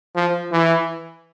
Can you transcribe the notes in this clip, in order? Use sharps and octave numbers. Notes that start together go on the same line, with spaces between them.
F3
E3